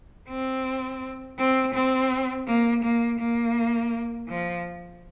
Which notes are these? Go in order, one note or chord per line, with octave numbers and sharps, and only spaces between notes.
C4
C4
C4
A#3
A#3
A#3
F3